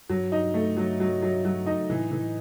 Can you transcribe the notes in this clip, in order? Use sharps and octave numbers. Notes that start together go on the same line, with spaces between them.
G2 F#3
D#4
A3
F#3
F#3
F#3
F#3
D#4
A2 E3
E3